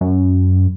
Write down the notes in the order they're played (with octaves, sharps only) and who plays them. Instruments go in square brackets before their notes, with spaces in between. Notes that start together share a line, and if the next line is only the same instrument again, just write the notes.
[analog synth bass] F#2